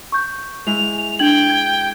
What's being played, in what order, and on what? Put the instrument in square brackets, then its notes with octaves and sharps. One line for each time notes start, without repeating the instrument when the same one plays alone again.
[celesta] C#6 G6
[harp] G#3 E4 [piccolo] F7
[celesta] D4 G#6 F#7 [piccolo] G5
[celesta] G#6